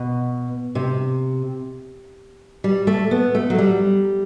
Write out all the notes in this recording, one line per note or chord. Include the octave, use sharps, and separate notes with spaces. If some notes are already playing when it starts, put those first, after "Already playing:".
Already playing: B2
C3
G3
A3
B3
A3
F#3
G3